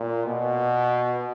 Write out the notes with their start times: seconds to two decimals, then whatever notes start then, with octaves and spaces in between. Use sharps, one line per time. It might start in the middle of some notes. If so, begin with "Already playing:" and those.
Already playing: A#2
0.26 B2